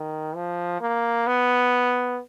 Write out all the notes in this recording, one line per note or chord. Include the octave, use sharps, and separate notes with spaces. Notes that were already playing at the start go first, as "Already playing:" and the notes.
Already playing: D#3
F3
A#3
B3